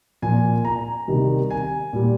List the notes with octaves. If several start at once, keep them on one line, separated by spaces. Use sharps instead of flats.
A#2 F3 G#5
A#5
C3 D#3 G3
G#5
A#2 G3